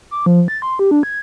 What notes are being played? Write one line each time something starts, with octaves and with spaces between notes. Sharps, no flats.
D6
F3
A6
C6
G4
D4
G#6